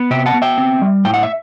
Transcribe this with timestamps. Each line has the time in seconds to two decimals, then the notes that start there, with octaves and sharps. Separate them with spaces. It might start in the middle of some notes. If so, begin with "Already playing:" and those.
Already playing: B3
0.11 C3 E5 G5
0.26 F#5 A5
0.34 B3
0.42 E5 G5
0.58 C4
0.82 G3
1.05 A2 G5
1.14 F#5
1.23 E5